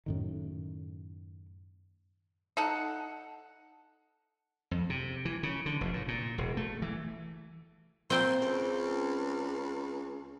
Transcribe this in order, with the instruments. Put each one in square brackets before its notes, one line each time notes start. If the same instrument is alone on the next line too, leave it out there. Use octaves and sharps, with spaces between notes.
[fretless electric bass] F#2 A2 D#3
[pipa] D#4 A4 F#5
[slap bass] F2
C3
E3
C#3
D3
F1
A2
A#2
E1
A3
E3
[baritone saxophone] A#2 [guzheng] C4 G5 C6
[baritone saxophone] C#2